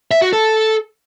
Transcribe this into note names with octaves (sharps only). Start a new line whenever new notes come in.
E5
F#4
A4